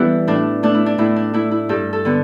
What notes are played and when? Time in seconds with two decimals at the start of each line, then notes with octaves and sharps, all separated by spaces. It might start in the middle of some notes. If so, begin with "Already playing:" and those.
Already playing: E3 G3 B3 E4 A4 B4
0.27 A2 D4
0.63 A3 D4
0.74 E4
0.86 D4
0.98 A2 E4
1.16 D4
1.34 A3 E4
1.51 E4
1.69 G2 A4
1.93 A4
2.05 D3 G3 B3